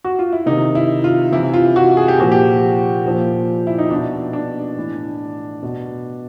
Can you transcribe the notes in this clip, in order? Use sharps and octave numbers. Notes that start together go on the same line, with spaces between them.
F#4
F4
E4
C3 D#3 D#4
E4
F4
C3 E3 E4
F4
F#4
G#4
G4
A#2 F3 F#4
G4
A#2 F3
E4
D#4
B2 D4
D4
A2 E3
B2